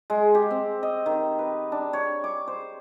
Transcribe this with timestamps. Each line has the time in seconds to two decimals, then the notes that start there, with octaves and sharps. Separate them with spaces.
0.10 G#3
0.35 G4
0.51 C4
0.83 D#5
1.06 D#3
1.39 B4
1.72 D4
1.93 C#5
2.24 D6
2.48 C5